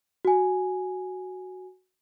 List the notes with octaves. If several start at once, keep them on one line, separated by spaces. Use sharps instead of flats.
F#4 G#5